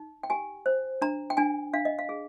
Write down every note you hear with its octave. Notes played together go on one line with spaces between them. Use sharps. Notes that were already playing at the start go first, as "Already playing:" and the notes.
Already playing: D#4
G5
G4 G#5
C5
D4 A#5
G5
D4 G#5
D4 F5
D#5
F5
G#4